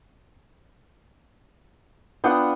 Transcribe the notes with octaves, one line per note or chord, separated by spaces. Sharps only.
B3 D4 F4 F#5 G5 D#6